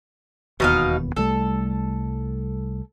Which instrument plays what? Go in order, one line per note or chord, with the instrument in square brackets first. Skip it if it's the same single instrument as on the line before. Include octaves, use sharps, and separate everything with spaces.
[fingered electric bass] E1 D#2 B3 [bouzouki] B2 D#4 F5
[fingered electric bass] C2 G3 A3 [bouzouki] A4